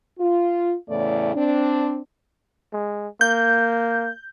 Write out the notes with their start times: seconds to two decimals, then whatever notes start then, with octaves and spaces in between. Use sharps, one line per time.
0.19 F4
0.89 E2 A2 C#3 A3 D5
1.35 C4 D4
2.73 G#3
3.21 A#3 G6